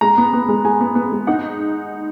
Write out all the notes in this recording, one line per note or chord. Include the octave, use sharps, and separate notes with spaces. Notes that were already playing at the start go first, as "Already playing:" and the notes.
G#3 A#5
B3
B3
G#3
G#3 G#5
B3
B3
G#3
D#4 F#5